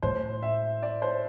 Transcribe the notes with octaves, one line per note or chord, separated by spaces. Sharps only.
A2 C5
E5
D5
C5